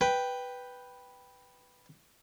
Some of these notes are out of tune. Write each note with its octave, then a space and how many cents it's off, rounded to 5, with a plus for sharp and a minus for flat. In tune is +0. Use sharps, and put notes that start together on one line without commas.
B4 +0 G5 +0